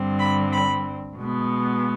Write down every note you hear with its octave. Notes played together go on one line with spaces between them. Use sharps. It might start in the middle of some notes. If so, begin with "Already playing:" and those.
Already playing: G2 D3 G3 C4
B5
B5
B2 G#3 B3